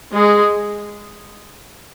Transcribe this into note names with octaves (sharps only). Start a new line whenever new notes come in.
G#3 G#4